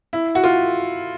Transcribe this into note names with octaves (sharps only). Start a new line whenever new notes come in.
E4
F#4
F4